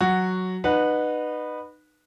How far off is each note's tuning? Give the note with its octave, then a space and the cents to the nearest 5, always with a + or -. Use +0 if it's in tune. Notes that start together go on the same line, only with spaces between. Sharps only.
F#3 +0 F#4 +0
D#4 -30 B4 +0 F#5 -15